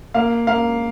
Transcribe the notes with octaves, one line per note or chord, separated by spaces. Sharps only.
A#3 F5
A#3 F5